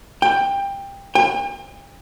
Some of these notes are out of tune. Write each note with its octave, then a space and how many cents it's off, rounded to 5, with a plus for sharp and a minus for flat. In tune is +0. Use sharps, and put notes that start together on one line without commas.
G5 +20
G5 +45